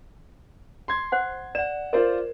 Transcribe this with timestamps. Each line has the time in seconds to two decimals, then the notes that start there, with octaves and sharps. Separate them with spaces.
0.88 C6 G#6
1.12 C5 F#5
1.55 D5 F#5 E7
1.93 F4 A#4 C5 D5